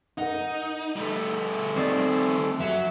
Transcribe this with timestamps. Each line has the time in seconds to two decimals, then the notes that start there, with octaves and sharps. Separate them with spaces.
0.18 D#4 A#4 F#5
0.96 G3 A3
1.76 D#3 C4 D5
2.60 F#3 E5